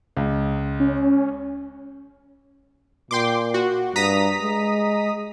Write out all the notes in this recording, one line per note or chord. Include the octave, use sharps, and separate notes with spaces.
C#2
C#4
A#2 G5 C6 D6
F#4
G2 A#5 D#6 B6
G#3